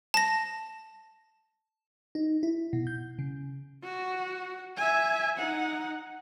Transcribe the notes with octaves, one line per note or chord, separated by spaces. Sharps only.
A5 A#6
D#4
E4
B2
G6
C#3
F#4
E5 G#5
D#4 F#5